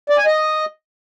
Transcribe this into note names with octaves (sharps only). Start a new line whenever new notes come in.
D5
G#5
D#5